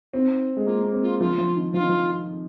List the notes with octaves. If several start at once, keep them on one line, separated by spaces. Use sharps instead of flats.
C4 D#4 F4
G#3
A#3 F4
A#3
C4
F4
F3 F4
F3
D#3
F3 F4
D#3
F3